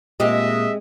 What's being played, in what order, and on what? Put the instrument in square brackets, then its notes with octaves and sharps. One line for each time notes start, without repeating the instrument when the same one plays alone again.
[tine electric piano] A#2 A#3 [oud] G#3 C4 G4 [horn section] D#5 E5